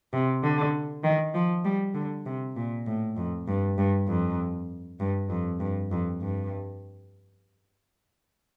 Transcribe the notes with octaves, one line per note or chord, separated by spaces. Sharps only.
C3
D3
D#3
F3
G3
D3
C3
A#2
A2
F2
G2
G2
F2
G2
F2
G2
F2
G2